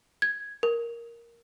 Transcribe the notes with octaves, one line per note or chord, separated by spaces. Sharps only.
G#6
A#4